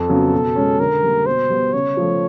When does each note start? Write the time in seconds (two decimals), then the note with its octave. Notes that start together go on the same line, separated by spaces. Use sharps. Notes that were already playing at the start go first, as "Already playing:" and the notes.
Already playing: F2 A4
0.09 C#3 F#3 B3
0.33 B2
0.56 G#3 C#4
0.79 D3 A#4
1.03 G3 A#3
1.26 B2 C5
1.50 G3 B3
1.73 C#3 C#5
1.97 F3 A3